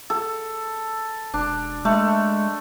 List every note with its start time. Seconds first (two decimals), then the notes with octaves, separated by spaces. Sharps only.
0.10 A4
1.34 E1 D4
1.85 G#3 A3